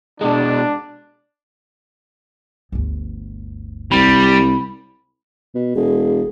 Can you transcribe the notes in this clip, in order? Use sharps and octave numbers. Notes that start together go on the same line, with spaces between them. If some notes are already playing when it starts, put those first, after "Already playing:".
B2 G#3 D4
G1 D2
C2 G3 B5
B2
E1 G#4